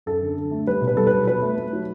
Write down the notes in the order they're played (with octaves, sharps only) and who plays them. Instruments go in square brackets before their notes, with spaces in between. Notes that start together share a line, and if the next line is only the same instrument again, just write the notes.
[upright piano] F#2 A4
D3
D3
A3
G3 B4
B2
B4
G3 A4
B4
B2
F#3 B4
A3
A3
F#3